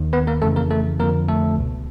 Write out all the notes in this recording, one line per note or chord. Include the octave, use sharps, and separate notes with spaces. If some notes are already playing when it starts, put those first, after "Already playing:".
Already playing: D#2 D#3
B3 B4
A#3 A#4
F2 C#3 E3 A3 A4
A#3 A#4
A3 A4
F2 D3 F3 A#3 A#4
A3 A4
C#2 B2